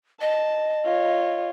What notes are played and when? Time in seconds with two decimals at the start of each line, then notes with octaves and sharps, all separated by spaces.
0.21 D#5 A5
0.85 F4 C#5